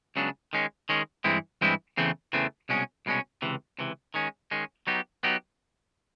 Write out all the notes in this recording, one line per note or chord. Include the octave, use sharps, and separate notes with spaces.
C#2 C#3 F#3 B3 D4
D#3 G#3 C#4
D#3 G#3 C#4
G2 E3 G#3 C4 E4
G2 E3 G#3 C4 E4
E2 C#3 E3 A3 C4
E2 C#3 E3 A3 C4
C2 B2 G#3 C#4
C2 B2 G#3 C#4
C#2 C3 E3
C#2 C3 E3
D#3 G#3 C#4
D#3 G#3 C#4
F#3 B3 D#4 G4
F#3 B3 D#4 G4